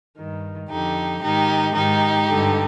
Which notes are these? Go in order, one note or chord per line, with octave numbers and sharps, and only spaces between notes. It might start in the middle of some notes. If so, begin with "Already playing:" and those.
G2 D#3
F2 D3 D#4 G4
G#2 D#3 D#4 G4
G#2 D#3 D#4 G4
G2 D3